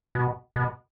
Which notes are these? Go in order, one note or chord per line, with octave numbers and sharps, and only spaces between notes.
B2
B2